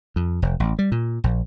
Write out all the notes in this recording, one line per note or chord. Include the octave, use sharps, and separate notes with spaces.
F2
F1
A1
G3
A#2
A#1